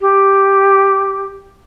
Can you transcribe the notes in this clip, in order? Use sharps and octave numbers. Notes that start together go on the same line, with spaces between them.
G4